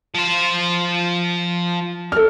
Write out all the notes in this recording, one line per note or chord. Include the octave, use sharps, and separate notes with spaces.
F3 C5
A4 F6